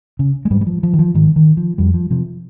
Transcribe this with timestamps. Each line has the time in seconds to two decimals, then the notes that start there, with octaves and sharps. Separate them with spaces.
0.19 C#3
0.45 G#3
0.51 G#2 G3
0.61 G3
0.67 F3
0.83 F3
0.93 D#3
0.99 F3
1.14 G#2 D#3
1.36 D#3
1.57 F3
1.78 F2 G3
1.94 F3
2.10 C3 F3